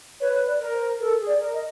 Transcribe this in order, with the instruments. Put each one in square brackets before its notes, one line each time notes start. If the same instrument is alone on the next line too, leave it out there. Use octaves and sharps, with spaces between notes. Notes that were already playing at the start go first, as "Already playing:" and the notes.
[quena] B4 [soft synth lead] C#5
[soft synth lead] D5
[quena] A#4
[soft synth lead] C5
[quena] A4 [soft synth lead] A#4
[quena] G#4
[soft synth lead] D5
[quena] A#4
[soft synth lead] D#5